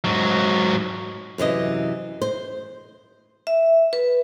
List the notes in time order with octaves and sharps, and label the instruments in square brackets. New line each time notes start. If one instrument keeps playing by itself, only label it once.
[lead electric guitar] G#2 F#3
[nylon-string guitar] F#2 C3 E3 D#5
C5
[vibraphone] E5
B4